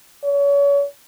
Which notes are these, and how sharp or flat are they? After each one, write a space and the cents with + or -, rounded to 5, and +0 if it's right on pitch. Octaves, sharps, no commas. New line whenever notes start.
C#5 +35